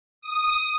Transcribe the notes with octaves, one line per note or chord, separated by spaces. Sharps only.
D#6